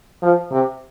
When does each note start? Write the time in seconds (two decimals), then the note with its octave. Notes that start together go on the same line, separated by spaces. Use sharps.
0.22 F3
0.51 C3